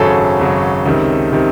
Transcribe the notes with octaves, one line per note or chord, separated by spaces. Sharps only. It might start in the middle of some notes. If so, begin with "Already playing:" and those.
Already playing: G#1 F#2 C#3 F#3 A4
G#1 F#2 C#3 F#3
C#2 C3 D#3
C3 D#3